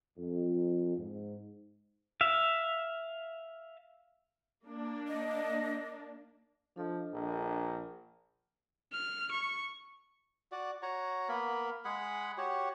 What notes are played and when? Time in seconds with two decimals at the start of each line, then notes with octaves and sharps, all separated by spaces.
0.18 F2
0.97 G#2
2.21 E5 F5
4.66 A#3 D4
5.08 D#5
6.76 F3 D4 A4 D#5
7.13 A#1
8.92 F6
9.31 C#6
10.52 F#4 D5
10.83 F#4 C#5 A#5
11.29 A#3 B3 A#4 B5
11.85 G#3 G#4 F#5 B5
12.38 F#4 G4 C#5